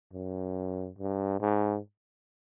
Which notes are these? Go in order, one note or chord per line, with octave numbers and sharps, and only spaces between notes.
F#2
G2
G#2